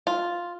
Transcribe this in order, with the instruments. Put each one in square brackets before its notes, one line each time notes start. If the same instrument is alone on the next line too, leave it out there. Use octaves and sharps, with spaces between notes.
[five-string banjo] F4